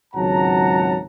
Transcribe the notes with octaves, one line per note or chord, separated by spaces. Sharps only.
G#1 C#2 F#3 F#5 A5 A#5